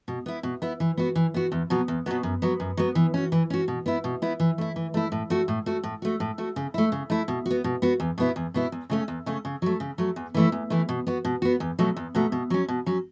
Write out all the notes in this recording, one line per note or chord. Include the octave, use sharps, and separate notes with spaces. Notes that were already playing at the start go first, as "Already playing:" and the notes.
B2
B3 E4
B2
B3 E4
E3
B3 F#4
E3
B3 F#4
E2
B2 F#3 B3
E2
B2 F#3 B3
F#2
F#3 B3
F#2
F#3 B3
E3
C#4 F#4
E3
C#4 F#4
B2
B3 E4
B2
B3 E4
E3
A3 E4
E3
A3 E4
A2
A3 F#4
A2
A3 F#4
A2
A3 F#4
A2
A3 F#4
C#3
A3 E4
C#3
A3 E4
B2
B3 F#4
B2
B3 F#4
E2
B2 B3 E4
E2
B2 B3 E4
E2
C#3 A3 C#4
E2
C#3 A3 C#4
C#3
F#3 A3
C#3
F#3 A3
E2
E3 A3 E4
E2
E3 A3 E4
B2
B3 F#4
B2
B3 F#4
E2
B2 F#3 A3
E2
B2 F#3 A3
B2
F#3 C#4
B2
F#3 C#4